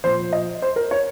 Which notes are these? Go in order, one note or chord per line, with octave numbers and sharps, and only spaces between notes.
A#2 F3 C5
D#5
C5
A#4
C#5